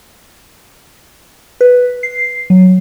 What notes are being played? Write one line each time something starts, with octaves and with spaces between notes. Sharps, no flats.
B4
C7
F#3